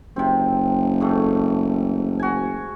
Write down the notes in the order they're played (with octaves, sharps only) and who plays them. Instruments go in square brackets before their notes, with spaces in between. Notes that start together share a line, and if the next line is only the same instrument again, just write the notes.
[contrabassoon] F#1 [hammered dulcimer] C3 C4
[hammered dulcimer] G#2 A3
F#4 G#5